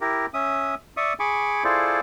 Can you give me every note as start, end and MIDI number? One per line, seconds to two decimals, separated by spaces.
0.01 0.26 64
0.01 0.26 67
0.01 0.26 70
0.34 0.75 61
0.34 0.75 76
0.34 0.75 87
0.97 1.13 74
0.97 1.13 76
0.97 1.13 85
0.97 1.13 87
1.20 1.64 68
1.20 1.64 80
1.20 1.64 83
1.20 1.64 85
1.20 1.64 86
1.64 2.00 64
1.64 2.00 65
1.64 2.00 68
1.64 2.00 69
1.64 2.00 72
1.64 2.00 74